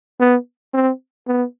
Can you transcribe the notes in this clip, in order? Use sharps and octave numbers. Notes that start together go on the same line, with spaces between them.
B3
C4
B3